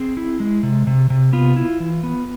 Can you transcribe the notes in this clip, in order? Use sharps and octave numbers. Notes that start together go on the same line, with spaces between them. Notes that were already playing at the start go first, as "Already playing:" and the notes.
Already playing: C4 G#4
E4
G#3
C3
C3
C3
B3 F4
E4
E3
B3